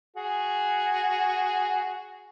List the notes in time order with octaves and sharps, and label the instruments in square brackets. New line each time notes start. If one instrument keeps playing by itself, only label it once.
[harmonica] F#4 G#4